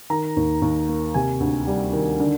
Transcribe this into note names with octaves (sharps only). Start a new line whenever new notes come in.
D#3 A#5
D#2
D#2
A#3
C3 G#5
D2
G3
D#3
D3